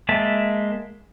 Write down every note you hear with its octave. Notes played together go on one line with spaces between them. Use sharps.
G#3 A#3 E5 A5